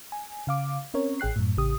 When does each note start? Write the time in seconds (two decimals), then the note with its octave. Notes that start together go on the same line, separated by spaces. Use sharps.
0.12 G#5
0.47 C#3 F5 D6
0.94 C4 C#4 A#4 C#5
1.20 A1 G#4 G5 F#6 C7
1.36 F#2 A2
1.57 A1 C#3 G4 D#6